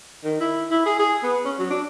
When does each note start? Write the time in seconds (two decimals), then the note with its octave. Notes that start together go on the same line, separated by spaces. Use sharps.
0.24 D#3
0.40 E4
0.70 E4
0.86 G#4
0.99 G#4
1.23 B3
1.45 C#4
1.59 F#3
1.70 D4